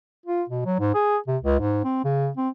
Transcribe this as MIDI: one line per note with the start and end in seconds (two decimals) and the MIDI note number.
0.26 0.43 65
0.50 0.66 47
0.66 0.78 54
0.79 0.91 44
0.94 1.17 68
1.27 1.37 48
1.43 1.58 37
1.60 1.83 44
1.84 2.02 60
2.04 2.29 49
2.37 2.49 60